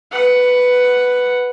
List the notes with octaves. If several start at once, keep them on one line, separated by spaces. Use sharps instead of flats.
B4 F#5